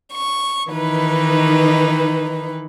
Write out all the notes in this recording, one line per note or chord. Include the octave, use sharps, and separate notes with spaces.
C#6
D#3 E3 D#4 B4